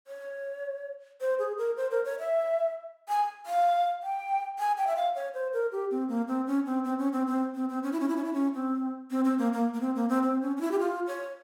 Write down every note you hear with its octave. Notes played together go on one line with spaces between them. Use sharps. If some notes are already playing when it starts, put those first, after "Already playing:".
C#5
C5
G#4
A#4
C5
A#4
C#5
E5
G#5
F5
G5
G#5
G5
E5
F5
C#5
C5
A#4
G4
C4
A#3
C4
C#4
C4
C4
C#4
C4
C4
C4
C4
C#4
E4
C#4
E4
C#4
E4
C#4
C4
C4
C4
A#3
A#3
A#3
C4
A#3
C4
C4
C#4
C#4
E4
G4
F4
C#5